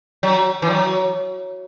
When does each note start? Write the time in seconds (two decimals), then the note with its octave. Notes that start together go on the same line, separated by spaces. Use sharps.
0.23 F#3
0.62 E3
0.70 F#3